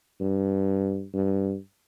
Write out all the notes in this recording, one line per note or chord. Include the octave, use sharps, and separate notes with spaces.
G2
G2